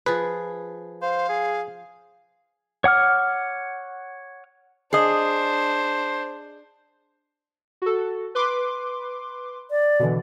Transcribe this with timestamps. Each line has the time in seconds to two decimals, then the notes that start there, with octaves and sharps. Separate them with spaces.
0.06 F3 G#4 B4
1.02 C5 F5
1.29 G#4
2.84 C#5 F#5 D6 F6
4.93 D4 G#4 C5 D#5
7.82 F#4 A4
8.35 B4 C6 D6
9.71 D5
10.00 B2 D3 E3